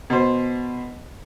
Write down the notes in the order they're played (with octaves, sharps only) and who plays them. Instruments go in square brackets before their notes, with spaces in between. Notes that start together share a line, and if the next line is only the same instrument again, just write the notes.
[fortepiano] B2 C5